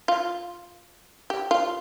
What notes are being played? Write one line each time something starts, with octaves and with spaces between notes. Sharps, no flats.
F4
G4
F4